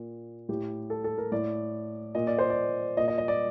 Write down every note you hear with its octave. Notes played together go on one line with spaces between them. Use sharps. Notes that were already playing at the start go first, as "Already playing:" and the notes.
Already playing: A#2
A2 G4
A4
A4
A#4
A2 D5
A#2 D#5
D5
C5
D5
A#2 D#5
D#5
D#5
D5